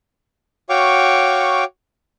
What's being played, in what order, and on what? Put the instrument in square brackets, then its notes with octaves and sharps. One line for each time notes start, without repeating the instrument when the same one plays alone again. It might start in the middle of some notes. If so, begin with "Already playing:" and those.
[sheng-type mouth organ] F#4 C#5 F5 G5 C#6 D6